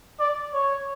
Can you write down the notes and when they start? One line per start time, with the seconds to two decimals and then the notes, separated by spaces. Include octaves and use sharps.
0.20 D5
0.53 C#5